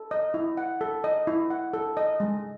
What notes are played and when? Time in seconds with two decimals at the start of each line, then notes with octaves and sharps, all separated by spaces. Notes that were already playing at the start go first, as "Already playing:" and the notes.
Already playing: A4
0.11 D#5
0.34 E4
0.57 F#5
0.81 A4
1.04 D#5
1.27 E4
1.50 F#5
1.74 A4
1.97 D#5
2.20 G#3